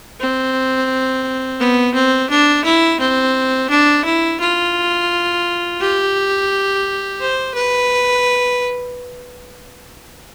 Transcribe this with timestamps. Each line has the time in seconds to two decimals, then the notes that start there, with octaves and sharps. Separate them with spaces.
0.20 C4
1.60 B3
1.94 C4
2.30 D4
2.65 E4
3.00 C4
3.70 D4
4.05 E4
4.40 F4
5.80 G4
7.20 C5
7.55 B4